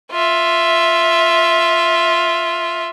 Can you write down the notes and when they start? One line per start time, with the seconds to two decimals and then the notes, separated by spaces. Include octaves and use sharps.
0.12 F4 E5